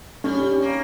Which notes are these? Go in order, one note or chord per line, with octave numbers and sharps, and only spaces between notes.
G3 C#4
A#3